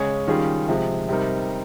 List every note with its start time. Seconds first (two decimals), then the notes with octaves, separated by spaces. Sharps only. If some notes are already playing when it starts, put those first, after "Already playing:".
Already playing: C#3 G#3 C#4 G#4 C#5
0.27 D#3 G3 C#4 F4 G#4
0.69 C3 F3 G#3
1.09 C3 G3 C4 D#4 A#4